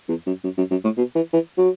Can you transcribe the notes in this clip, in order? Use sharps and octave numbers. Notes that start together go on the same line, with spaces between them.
E2
F#2
F#2
F#2
F#2
A2
B2
E3
E3
F#3